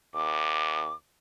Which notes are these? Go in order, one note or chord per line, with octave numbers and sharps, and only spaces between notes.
D#2 D6